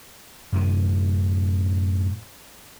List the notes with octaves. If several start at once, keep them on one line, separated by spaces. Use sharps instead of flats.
F#2 A2 C3 D#3